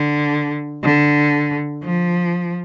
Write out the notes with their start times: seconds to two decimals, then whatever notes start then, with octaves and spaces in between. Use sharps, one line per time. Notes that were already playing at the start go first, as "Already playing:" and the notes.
Already playing: D3
0.83 D3
1.83 F3